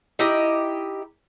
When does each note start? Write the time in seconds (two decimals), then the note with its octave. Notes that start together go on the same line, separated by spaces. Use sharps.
0.19 D#4 E4 G4 D#5